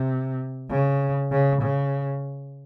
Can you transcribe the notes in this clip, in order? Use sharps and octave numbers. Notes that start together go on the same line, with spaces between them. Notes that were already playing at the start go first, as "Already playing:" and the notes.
Already playing: C3
C#3
C#3
C#3